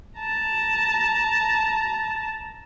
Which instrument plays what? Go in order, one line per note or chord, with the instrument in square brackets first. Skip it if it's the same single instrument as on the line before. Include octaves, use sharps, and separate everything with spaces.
[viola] A5 A#5